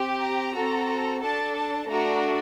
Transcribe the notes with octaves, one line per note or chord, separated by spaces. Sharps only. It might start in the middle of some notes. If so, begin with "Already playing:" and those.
Already playing: C4 G4
A#5
C4 F#4 A4
D4 A4 A5
A5
A3 D4 F#4 A#5